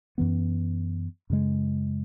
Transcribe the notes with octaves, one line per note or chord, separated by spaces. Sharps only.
F#2 E3 B3
F#2 C#3 G#3